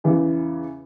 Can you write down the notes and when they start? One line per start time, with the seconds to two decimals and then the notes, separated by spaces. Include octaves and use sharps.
0.04 E2 C#3 E3